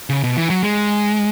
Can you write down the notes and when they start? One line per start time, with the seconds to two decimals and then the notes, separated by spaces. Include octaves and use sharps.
0.10 C#3
0.23 B2
0.37 E3
0.50 F#3
0.63 G#3